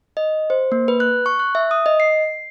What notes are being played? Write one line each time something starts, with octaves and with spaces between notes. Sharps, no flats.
D#5
C5
A#3
B4
F#6
C#6
F#6
E5
D#6
D#5
C7